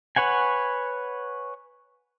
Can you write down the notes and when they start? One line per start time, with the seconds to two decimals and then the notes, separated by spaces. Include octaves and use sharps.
0.16 B4 C#5 F#5 G#5